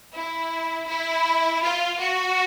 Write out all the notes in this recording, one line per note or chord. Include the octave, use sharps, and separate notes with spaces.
E4
E4
F4
F#4